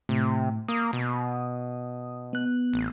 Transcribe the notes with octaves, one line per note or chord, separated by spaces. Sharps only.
A2 C3
A#3 D#6
B2
B3 F#6
A1